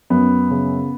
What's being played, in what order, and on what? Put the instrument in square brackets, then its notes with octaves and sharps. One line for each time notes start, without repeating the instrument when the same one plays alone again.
[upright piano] F#2 B3
C#3